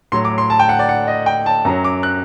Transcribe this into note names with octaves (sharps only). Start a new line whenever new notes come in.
A2 F#3 C6
D6
C6
A5
G5
F#5
D5
F#5
D#5
G5
A5
F#2 F#3 A#5
D6
F#6